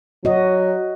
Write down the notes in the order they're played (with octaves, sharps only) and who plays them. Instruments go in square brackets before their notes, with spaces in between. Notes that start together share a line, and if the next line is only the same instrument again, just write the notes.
[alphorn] F#3 [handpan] F#4 D#5